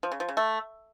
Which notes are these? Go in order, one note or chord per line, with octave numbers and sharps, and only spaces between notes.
F3
C#3
F3
C#3
A3